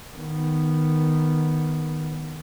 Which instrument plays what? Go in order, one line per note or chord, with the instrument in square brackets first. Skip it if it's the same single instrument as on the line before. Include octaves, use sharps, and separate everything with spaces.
[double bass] D#3 B3